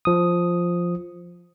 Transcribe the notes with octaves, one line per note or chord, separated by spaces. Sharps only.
F3 D#6